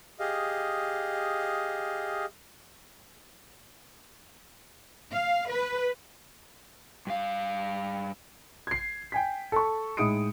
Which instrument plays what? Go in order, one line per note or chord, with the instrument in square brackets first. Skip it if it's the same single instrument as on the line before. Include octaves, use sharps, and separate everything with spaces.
[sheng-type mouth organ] G4 G#4 D#5 F5
[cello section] F5
B4
[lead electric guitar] G2 F5
[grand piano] G#6 C7
G5 G#5 B6
A4 C#6
A2 G#3 D#4 D#6 C#7 D7